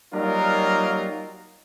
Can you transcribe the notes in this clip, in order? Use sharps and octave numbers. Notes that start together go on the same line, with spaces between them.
F#3 G3 A#3 D#4 F4 A#4